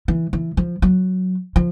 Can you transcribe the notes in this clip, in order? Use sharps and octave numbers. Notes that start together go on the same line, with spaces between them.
E3
E3
F3
F#3
F3